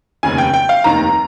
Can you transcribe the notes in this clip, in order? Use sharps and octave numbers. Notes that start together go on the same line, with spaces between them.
F1 D#2 C#3 G#5
G5
G5
F5
F1 D#2 D#3 A#5